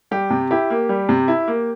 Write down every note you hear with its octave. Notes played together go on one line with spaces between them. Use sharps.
G3 G4
C3
E4 G4
A#3
G3
C3
E4
A#3